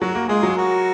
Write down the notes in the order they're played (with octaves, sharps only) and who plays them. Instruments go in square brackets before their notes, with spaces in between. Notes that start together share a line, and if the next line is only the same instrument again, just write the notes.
[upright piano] F#3 [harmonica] F#4 A#4
[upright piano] A#3
[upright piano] G#3 [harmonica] F4 G#4
[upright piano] F#3
[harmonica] F#4 A#4